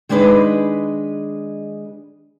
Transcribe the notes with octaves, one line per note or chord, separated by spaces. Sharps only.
D#3 G#3 D4 G#4 B4 D#5